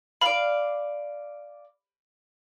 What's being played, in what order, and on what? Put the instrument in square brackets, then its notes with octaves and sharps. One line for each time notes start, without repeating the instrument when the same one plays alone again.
[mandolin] D5 F5 [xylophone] B5